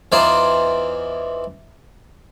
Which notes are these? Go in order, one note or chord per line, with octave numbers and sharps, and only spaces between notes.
E2 E3 D#4 F4 C5 D5